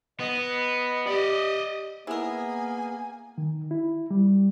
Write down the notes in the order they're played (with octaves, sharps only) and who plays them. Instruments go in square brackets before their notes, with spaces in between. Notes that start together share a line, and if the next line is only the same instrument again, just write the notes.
[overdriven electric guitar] B3 [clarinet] D#5
[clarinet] G4 [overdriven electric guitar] D5 D#5
[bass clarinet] A#3 [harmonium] B3 G#4 [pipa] E4 A#4 [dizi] G#5
[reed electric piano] D#3
E4
G3